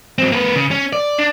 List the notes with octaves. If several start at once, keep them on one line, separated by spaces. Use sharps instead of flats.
F#3 C4
A#3 B4
C#3
C#4
D5
D4